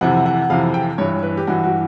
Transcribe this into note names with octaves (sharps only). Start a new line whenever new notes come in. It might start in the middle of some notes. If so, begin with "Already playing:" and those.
F2 C3 E3 F#5
F#5
F2 C3 E3 F5
G5
G2 E3 C#5
B4
G4
G2 E3 F#4
F#4